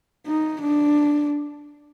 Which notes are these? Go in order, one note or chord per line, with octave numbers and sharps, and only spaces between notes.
D#4
D4